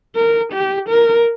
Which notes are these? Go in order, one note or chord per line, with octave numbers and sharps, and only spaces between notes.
A#4
G4
A#4